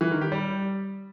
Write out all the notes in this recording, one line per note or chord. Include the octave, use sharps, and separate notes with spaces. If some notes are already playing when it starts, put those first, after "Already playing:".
E3
D#3
G4
G3